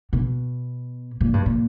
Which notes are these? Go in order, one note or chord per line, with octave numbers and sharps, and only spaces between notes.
B2
A#2
G2
A#2